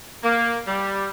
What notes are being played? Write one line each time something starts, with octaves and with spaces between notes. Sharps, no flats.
A#3
G3